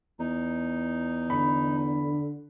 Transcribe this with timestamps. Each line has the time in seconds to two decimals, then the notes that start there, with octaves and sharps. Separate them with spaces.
0.19 E2 D#4
1.30 D3 B5